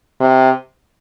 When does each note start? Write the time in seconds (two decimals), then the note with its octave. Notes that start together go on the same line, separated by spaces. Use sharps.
0.21 C3